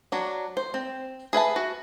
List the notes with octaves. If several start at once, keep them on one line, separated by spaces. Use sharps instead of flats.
F#3 D4
C5
C4
G#4 B4 E5 A5
F#4